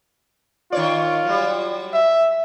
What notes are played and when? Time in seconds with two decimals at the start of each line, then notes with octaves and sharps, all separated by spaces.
0.72 D#3 F4 C#5 D5
1.25 F#3 G3
1.94 E5